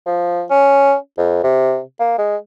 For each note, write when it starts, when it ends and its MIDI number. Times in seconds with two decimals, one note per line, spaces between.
0.07 0.43 53
0.50 0.94 61
1.18 1.40 41
1.44 1.80 48
1.99 2.14 58
2.18 2.36 56